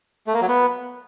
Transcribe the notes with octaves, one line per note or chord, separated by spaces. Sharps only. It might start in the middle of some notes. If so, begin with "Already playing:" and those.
A3
A#3
F#3
B3